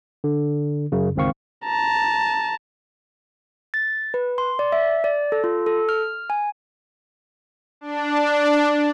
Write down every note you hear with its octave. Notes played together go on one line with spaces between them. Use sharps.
D3
F#2 C#3
G1 C#2 D#3 C4 F5 C#6
A5 A#5
A6
B4
C6
D5
E5
D5
A4
F4
A4
F6
G#5
D4